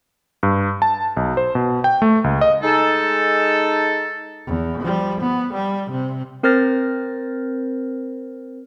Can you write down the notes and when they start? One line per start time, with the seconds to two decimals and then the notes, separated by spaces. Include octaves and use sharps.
0.43 G2
0.82 A5
1.17 B1
1.37 C5
1.55 B2
1.84 G5
2.02 A3
2.24 C#2
2.41 D#5
2.63 G#3 D#4 A4
4.47 E2
4.81 F3 G3
5.20 B3
5.53 G3
5.90 C3
6.43 C4 A#4 C5 F6 A6 A#6